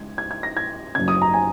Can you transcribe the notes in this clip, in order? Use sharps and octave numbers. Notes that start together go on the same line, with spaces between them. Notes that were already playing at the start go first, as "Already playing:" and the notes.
Already playing: C#2 G#6
G#6
G#6
A#6
G#6
F#1 F#2 C#3 G#6
D#6
A#5
G#5